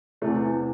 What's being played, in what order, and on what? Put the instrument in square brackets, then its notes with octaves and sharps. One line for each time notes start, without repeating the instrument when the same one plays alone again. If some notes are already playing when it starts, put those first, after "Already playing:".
[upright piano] E2 C3 E3 A3